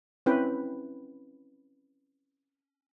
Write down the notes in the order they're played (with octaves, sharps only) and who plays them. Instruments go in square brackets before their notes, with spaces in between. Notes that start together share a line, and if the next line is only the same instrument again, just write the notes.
[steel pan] C4 C#4 E4 B4 G5